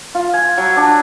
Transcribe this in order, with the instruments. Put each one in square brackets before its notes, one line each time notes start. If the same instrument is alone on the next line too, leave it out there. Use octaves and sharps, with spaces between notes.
[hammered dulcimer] F4
G#5
F#3
D4